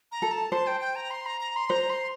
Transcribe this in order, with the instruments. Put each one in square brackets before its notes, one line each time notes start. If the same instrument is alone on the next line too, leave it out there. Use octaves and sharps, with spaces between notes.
[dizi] A#5
[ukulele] A4
[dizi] A5
[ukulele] C5 [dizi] A5
[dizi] G5
G5
A#5
C6
A#5
A#5
C6
[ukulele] C5 [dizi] A#5
[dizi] C6